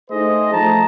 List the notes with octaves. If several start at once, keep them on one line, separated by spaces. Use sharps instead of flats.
A3 D#4 G#4 C5 D#5
F3 A3 A5 A#5